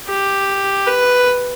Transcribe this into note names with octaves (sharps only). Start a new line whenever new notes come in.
G4
B4